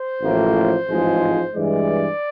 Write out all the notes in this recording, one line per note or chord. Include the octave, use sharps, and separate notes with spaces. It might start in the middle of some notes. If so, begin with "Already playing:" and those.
Already playing: C5
A1 A2 F3 A#3
A1 G#2 F3 G#3
G2 E3 G#3 D5